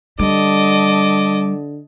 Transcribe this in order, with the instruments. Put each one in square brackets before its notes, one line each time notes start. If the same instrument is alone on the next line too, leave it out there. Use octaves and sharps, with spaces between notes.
[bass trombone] D3 [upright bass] G3 [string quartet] D#5 A5 [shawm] D6